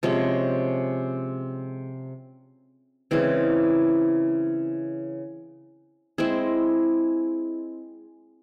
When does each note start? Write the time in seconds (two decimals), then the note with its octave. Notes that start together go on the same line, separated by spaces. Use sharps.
0.03 C3 F3 G#3 C#4
3.11 C#3 E3 G#3 C4
6.18 G#3 C4 E4 G#4